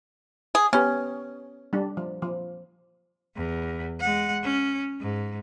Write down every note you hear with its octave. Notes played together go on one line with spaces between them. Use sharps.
G#4
B3 C#4 G4
G3 D4
F3
F3
E2
G#3 F#5
C#4
G#2